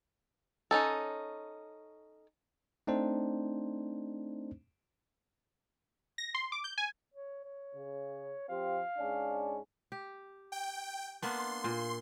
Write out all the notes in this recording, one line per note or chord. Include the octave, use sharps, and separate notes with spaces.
C#4 D#4 A4
A3 C4 D4 D#4 C5
A#6
C6
D6
G6
G#5
C#5
C#5
C#3
F3 C4 G4 F5
G#2 C#4 D4
G4
G5
A#3 B3 D4 C6
A#2